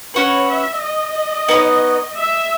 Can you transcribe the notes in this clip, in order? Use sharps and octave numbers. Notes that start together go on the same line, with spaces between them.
C#4 F#4 B4 C#5
E5
D#5
B3 D#4 A#4 C#5
E5